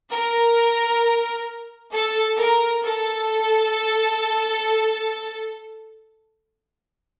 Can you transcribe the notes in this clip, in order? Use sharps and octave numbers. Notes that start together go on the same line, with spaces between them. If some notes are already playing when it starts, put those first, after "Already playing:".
A#4
A4
A#4
A4